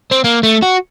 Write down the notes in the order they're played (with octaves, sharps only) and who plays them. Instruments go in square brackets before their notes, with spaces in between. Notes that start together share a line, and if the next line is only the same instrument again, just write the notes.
[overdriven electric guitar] C4
A#3
A3
F#4